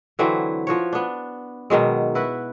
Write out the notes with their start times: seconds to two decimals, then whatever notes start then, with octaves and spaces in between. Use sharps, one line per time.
0.19 D3 E3 F#3 C4
0.67 F3 F#4 C#5
0.93 B3 D4
1.70 B2 D#3 F#3 G#3
2.15 E4 F#4 B4